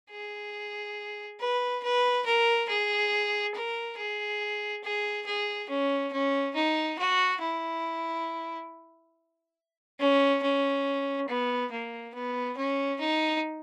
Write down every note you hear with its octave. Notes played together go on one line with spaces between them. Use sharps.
G#4
B4
B4
A#4
G#4
A#4
G#4
G#4
G#4
C#4
C#4
D#4
F#4
E4
C#4
C#4
B3
A#3
B3
C#4
D#4